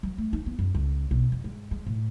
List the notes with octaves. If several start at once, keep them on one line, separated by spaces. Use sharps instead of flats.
F#3
A3
D#4
B3
F#2
C#2
B1
F2
G#2
G#3
A2